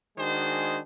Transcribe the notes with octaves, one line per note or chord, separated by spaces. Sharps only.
D#3 G#3 D4 F#4 G#4 C5